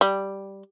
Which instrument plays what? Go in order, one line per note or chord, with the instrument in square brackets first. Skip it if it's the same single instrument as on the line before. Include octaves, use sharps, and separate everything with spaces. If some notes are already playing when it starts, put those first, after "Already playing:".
[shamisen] G3